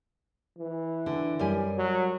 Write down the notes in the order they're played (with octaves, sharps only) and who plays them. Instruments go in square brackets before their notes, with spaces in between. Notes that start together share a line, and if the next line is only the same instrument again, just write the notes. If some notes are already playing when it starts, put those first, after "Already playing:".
[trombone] E3
[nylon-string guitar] D3
F#2 G3 G#5
[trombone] F#3